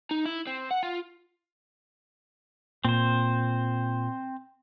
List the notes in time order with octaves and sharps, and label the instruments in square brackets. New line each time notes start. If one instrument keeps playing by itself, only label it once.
[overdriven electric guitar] D#4
E4
C4
F#5
F4
[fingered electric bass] A#2 [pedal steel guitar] C4 C5